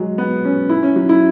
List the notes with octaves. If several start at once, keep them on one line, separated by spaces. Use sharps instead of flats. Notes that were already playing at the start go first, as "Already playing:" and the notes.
Already playing: F#3 G#3
B3
C#4
E4
C#4
F#3
E4